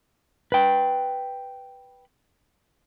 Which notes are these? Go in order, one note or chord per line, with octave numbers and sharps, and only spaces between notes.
B4 G5